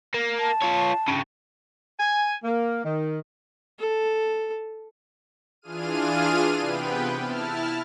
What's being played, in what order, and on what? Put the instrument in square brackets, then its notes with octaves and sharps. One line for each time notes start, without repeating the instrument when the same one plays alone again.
[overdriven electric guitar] A#3
[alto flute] A5
[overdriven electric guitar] F4 C#5
G2 C#3
[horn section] G#5
A#3
D#3
[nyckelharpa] A4
[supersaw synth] E3 D4 F4 G#4 F6 D#7
C3 B3 B4 G5
E4 A5 F6